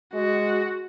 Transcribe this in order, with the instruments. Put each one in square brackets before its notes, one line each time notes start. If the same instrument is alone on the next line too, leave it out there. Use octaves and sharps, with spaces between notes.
[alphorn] G#3 [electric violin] F#4